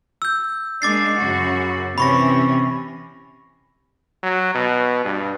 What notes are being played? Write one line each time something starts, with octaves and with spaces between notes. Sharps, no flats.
E6 G6
G#3 A#3 D4 D6 A6 C7
F#2 C#3 F#4
C3 E3 C#4 B5 C#6 A#6
F#3
B2
G2